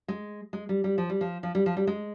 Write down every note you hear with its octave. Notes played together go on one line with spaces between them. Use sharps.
G#3
G#3
G3
G3
F3
G3
F3
F3
G3
F3
G3
G#3